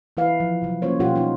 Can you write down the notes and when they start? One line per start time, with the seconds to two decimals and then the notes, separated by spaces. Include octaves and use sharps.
0.17 E3 E4 B4 F5
0.40 F3
0.62 C3 F#3
0.82 A#3 C#4 F4 C5 C#5
1.00 B2 F3 G3 F4 G4 F#5
1.16 C#4 D#4 F4